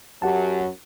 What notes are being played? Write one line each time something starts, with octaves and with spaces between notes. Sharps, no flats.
F#2 F#3 G4 F#5 A5